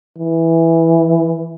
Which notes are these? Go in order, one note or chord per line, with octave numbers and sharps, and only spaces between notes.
E3